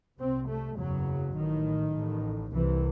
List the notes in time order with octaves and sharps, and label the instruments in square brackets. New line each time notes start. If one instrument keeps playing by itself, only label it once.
[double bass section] C2 C3 C4
A3
F#1 E2 C#3 F#3
A1 A2 D#3
A1 A2
C2 C3 E3